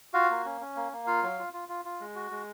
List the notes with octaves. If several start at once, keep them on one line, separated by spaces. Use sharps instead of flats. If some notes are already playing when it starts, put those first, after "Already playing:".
F4 F#4 F5
A#3
C#4
C#4
A#3
A#3
F4 F5
F#3
F4
F4
F4
F4
G#3
F#4
G#3